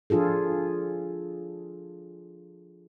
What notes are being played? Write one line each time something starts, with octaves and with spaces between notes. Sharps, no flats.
F3 D4 F4 G#4 A4